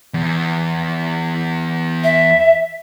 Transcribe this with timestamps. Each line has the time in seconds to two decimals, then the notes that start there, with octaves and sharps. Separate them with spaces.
0.14 E2
2.04 E5